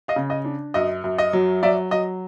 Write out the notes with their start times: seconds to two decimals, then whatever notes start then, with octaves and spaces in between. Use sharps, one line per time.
0.08 D#5 F5
0.16 C#3
0.30 D#5
0.45 D4
0.74 F#2 D#5
1.04 F#2
1.18 D#5
1.33 F#3
1.63 F#3 D5 E5
1.91 F#3 D#5